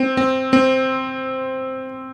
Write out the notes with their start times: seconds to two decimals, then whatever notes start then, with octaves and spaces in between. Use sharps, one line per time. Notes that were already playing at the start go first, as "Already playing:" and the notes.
Already playing: C4
0.17 C4
0.53 C4